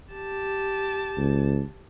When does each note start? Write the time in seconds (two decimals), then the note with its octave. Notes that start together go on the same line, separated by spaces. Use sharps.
0.13 G4 A5
1.17 C#2